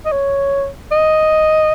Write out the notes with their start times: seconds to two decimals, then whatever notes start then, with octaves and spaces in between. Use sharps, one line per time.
0.06 D#5
0.12 C#5
0.92 D#5